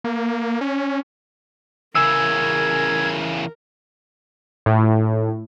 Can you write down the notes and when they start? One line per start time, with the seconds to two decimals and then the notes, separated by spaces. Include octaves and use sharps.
0.04 A#3
0.61 C#4
1.95 E2 C#3 A#4 E6 G#6
4.66 A2